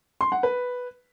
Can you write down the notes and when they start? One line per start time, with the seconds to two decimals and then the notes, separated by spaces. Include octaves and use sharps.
0.21 C6
0.32 F#5
0.43 B4